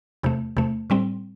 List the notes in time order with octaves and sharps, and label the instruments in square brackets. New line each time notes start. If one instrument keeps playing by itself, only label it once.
[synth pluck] E2 C3 A3
E2 C3 A3
A2 G3 C4